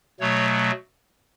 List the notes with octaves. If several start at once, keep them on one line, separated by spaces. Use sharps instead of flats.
B2 F#3 A3 C#5